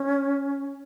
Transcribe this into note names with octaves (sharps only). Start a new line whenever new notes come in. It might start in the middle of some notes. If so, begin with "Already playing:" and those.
Already playing: C#4